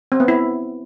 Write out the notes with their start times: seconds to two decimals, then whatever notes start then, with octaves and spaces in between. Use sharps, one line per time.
0.12 C4
0.20 B3
0.28 E4